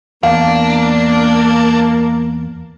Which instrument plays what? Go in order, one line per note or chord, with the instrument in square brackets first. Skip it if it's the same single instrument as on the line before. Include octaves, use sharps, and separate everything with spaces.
[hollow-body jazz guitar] E2 [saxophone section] A#3 [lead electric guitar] D4 [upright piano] F5